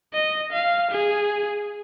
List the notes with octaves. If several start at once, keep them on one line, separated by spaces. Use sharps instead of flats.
D#5
F5
G#4